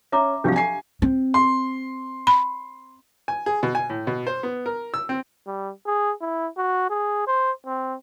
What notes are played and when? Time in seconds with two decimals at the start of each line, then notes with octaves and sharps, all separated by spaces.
0.12 C#4 E5 A#5 D6
0.44 C2 F3 F#3 D4 G4 F5
0.56 G#5 C7
1.02 C4
1.34 C6
2.27 B5
3.28 G#5
3.46 G#4
3.63 B2
3.75 G#5
3.90 A2
4.07 B2
4.27 C5
4.43 B3
4.66 A#4
4.94 E6
5.09 C4
5.47 G3
5.86 G#4
6.21 E4
6.57 F#4
6.90 G#4
7.27 C5
7.66 C4